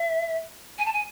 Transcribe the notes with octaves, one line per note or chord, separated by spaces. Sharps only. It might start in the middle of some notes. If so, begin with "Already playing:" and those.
Already playing: E5
G#5
A5
G#5